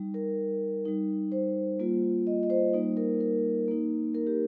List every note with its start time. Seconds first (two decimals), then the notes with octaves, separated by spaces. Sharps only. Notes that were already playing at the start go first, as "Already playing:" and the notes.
Already playing: G3 D#4
0.14 A#4
0.85 G3 D#4
1.32 C5
1.80 G3 A#3 F4
2.27 D#5
2.43 D#5
2.50 C5
2.73 G3 A#3 D#4
2.97 A#4
3.21 A#4
3.68 A#3 D#4
4.15 A#4
4.27 G4